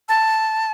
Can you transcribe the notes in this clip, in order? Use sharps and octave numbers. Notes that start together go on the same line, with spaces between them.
A5